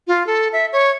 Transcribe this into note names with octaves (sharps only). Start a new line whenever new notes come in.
F4
A4
E5
C#5